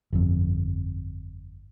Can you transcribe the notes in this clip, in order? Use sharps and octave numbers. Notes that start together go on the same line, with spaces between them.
G1 F2